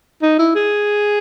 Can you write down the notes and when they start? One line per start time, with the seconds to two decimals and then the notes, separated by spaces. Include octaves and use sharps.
0.22 D#4
0.39 E4
0.55 G#4